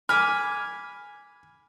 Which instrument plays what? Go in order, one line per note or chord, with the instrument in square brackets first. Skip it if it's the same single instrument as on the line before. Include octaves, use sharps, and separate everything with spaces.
[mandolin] G#5 B5 D6 [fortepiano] F6